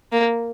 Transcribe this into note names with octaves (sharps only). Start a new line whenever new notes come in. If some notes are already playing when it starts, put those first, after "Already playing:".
A#3